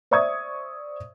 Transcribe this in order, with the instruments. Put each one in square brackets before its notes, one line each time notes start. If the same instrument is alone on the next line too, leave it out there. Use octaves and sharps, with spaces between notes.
[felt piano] C5 D5 E5 C#6 D#6 G#6